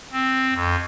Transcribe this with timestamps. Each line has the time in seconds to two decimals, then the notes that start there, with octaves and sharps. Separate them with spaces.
0.12 C4
0.54 F2